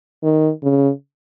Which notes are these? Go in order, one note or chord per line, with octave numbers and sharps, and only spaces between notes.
D#3
C#3